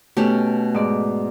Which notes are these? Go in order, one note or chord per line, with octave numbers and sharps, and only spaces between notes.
B2 A3 C#4 G4 A5
G#2 D5